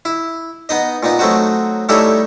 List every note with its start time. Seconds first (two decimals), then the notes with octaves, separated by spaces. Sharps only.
0.05 E4
0.69 B3 D#4 D#5
1.03 A#2 B3 D#4
1.19 F#3 A3 C4 D#4 F#4
1.89 G3 A3 D#4 E4 A4 C#5